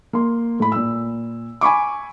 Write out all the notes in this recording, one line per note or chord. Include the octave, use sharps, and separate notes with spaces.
A#3 C6
A2 B5
A#2 E6
G#5 B5 C#6 D6